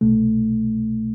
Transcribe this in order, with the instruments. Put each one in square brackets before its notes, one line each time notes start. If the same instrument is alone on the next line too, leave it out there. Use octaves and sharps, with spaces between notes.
[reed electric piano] C2 B2 A3